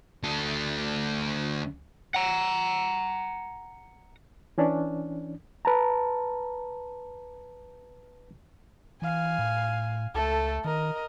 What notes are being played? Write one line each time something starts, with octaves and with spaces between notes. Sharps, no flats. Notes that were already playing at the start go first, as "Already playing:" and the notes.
D2 A4
F#5 A#5
E3 C#4 D4
B4 A5 A#5
E3 F5 G#5
A2
C#2 A3 A4
D#3 A#4 D#5